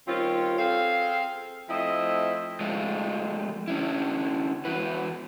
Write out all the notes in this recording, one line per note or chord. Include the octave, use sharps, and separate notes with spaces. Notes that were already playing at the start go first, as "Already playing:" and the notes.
D#3 G3 C4 C#4 F4
C4 G#4 A4 F5
F3 A3 C4 E4 D#5 E5
F3 G#3 A3 F4
D3 C#4 E4
E2 E4 F#4 B4